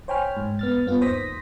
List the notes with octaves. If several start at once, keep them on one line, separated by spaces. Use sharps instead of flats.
C5 C#5 G5 G#5 B5 F6
G#2
B3 F6 A6
G2 B3 F4
D#2 D#3 C5 D#6 A#6 B6